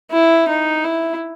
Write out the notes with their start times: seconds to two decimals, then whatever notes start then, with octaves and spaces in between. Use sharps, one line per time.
0.11 E4
0.48 D#4
0.84 E4